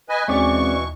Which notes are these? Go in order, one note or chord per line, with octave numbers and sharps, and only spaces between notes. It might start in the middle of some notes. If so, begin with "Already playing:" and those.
B4 D#5 G#5
D#2 B2 E3 G#3 C4 C#4 D5 C#6